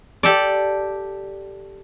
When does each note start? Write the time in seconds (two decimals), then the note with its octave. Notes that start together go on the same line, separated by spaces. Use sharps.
0.23 G4 A4 D5